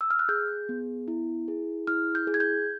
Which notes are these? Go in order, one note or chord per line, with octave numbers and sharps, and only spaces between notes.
E6
F6
F#6
G#4 G6
B3
E4
G#4
E4 F6
G6
G#4
G#6
G6